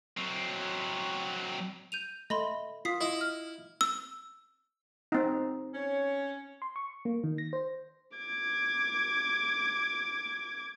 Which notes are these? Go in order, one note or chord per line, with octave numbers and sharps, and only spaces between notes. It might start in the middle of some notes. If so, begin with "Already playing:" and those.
F#3 C4
G6 D#7 F7
A3 D#5 B5 C6
F4 D#6 B6 C7
E4 D#5
F6
E6
C4 D#4
C#4 C#5
C6
C#6
A#3
D#3
A#6
C5
D6 G#6